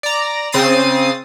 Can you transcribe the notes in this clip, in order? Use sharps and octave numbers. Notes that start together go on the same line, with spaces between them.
D5 A#5
C#3 C4 D#6 A6 C7 D#7